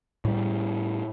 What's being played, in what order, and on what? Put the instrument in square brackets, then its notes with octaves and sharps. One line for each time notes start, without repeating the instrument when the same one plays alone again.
[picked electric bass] A2 G3